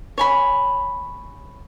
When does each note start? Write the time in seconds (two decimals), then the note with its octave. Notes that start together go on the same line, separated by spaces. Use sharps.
0.18 C#5 G#5 B5